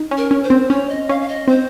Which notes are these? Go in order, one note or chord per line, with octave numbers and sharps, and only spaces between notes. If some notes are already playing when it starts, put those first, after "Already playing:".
Already playing: D#4
C#4
A#4
C#4
C5
C4
C#4 C#5
D#5
C#4 F5
F5
D#5
C4 C5